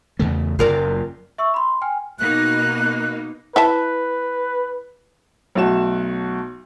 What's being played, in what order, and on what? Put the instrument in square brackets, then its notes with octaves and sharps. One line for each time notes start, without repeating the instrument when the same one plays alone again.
[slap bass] E2 C#3 A3
[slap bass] F#1 F#2 [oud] F4 A#4 D5
[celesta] E5 C#6 E6
B5 C6
G5 G#5 F6
[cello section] B2 A#3 D#4 [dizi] F#6
[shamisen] E4 E5 A5 [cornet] B4
[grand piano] B1 A3 F#4 E7